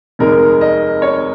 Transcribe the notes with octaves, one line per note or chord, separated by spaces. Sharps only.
F1 D#2 D#3 G#3 A#4
D#5
C#5